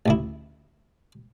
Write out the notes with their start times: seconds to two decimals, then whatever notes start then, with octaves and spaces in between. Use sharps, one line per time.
0.06 A1 D2 E4